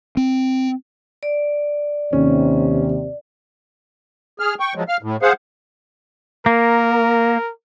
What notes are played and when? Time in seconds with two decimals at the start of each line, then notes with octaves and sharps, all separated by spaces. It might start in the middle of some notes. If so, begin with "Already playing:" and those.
0.17 C4
1.23 D5
2.13 D#2 C3 C#4
4.39 G#4 F6
4.60 G5 C#6
4.75 F3 F#3 G#3
4.88 F5 F6
5.03 A2
5.22 G#4 C5 F5 F#5
6.46 A#3 A#4